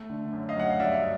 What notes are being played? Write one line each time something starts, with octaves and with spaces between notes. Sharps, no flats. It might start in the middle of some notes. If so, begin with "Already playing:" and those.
Already playing: A3
D3
F#2
D#5 F5
F#3 F#5
F5
G2 D5 E5